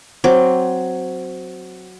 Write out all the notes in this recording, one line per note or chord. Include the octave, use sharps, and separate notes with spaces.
F#3 C4 D6